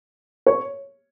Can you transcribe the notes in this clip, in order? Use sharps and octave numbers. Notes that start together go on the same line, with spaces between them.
C#5